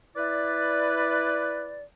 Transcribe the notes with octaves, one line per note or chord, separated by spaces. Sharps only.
E4 B4 D5